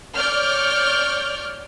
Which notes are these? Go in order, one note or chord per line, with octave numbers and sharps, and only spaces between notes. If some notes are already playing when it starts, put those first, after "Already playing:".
C#5 D5 F6 G6